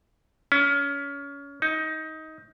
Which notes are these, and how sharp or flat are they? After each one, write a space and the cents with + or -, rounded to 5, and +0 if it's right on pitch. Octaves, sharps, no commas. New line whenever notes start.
C#4 +25
D#4 +20